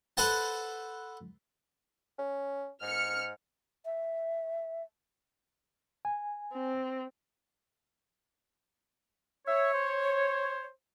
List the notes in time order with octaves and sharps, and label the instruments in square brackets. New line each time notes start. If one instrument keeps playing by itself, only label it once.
[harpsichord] A4 B4 C5 F#5 A5
[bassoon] C#4
[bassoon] G#2 [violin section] F6 C#7
[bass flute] E5
[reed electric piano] G#5
[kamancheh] C4
[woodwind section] C#5 [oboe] E5
[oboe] C5